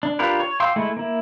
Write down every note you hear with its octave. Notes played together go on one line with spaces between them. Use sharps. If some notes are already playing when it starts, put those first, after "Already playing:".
D4
D4 F4 G4 A#4 B4
C#5
F5 G5 C6 D6 E6
G#3 A3 E4
A#3 E4